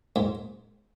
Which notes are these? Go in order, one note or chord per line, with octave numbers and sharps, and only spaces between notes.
G#2